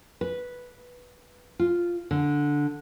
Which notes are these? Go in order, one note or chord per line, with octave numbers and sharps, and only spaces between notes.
B4
F4
D3